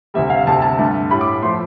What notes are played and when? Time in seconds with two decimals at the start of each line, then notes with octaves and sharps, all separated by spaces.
0.14 D2 C3 G3 E5
0.30 F5
0.46 D2 C3 G3 A5
0.62 A5
0.78 G2 D3 A3
1.11 A2 G3 B5
1.21 D6
1.42 F3 A3 C6